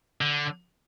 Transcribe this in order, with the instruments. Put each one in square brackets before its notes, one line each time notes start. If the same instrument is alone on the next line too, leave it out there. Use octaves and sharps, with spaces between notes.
[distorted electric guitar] D3